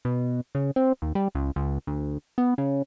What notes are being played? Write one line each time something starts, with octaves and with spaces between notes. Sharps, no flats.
B2
C#3
C4
D#2
G3
C#2
C#2
D2
B3
C#3